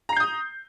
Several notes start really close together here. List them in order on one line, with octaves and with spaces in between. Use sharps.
A#5 C7 G6 D#6